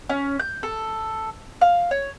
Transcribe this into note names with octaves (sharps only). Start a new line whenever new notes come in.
C#4
G6
A4
F5
C#5